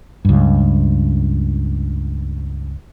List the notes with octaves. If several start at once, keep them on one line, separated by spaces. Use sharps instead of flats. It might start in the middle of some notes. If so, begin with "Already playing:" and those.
C#2 G2